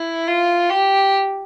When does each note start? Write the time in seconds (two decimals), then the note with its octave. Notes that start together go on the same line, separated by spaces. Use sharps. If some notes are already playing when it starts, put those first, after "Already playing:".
Already playing: E4
0.28 F4
0.70 G4